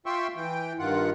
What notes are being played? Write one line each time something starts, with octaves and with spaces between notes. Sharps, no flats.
F4 E5 G5 C6 C#6 E6
E3 G5
G2 D#3 F4 F#5